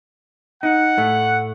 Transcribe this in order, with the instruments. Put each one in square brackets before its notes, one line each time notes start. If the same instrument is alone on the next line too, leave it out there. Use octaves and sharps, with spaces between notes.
[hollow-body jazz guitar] D#4 [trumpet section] F#5
[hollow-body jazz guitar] A2 A3